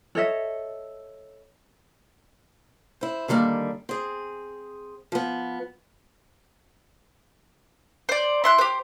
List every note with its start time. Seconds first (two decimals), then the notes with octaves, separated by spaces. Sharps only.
0.15 A4 C#5 D#5 E5
3.01 E4 C5
3.28 D3 D#3 G3 A3 A#3
3.89 C4 G#4
5.12 F3 B3
8.09 C5 D5
8.44 E4 C6 F#6
8.58 G4 C5